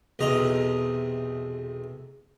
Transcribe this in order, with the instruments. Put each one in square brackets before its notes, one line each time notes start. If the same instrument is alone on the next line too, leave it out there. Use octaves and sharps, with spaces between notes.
[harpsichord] B1 E2 C3 D#5 A#5